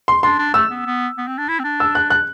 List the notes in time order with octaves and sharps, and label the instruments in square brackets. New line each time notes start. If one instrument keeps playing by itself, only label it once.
[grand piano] C6
[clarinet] D4 [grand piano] C6
[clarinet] D4
[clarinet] A3 [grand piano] E6
[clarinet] B3
B3
B3
C4
D4
E4
C4
D4
[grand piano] E6
F#6
F#6